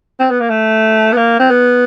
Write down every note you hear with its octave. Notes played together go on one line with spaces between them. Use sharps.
C4
B3
A#3
A3
B3
A#3
C4
B3